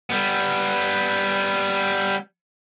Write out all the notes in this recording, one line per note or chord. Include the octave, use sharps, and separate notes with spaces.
G3 B3